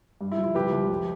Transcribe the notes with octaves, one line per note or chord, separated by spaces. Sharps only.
G2
E4
F3
E4
C2 G4 B4
C2
F2